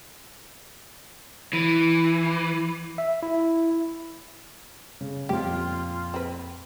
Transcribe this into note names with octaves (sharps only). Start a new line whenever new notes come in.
E3
E5
E4
C#3
F2 A#2 F4 G4
C4 B4